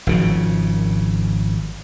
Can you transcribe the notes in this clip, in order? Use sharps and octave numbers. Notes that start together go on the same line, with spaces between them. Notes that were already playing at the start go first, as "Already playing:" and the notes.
G#1 C#3 F3